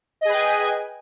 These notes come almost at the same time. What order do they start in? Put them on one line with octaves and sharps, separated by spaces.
D#5 G#4 B4 G5 G#5